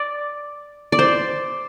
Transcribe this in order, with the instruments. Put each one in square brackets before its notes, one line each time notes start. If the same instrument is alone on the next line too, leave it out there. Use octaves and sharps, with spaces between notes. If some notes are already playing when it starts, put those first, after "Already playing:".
Already playing: [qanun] D5
D5
C5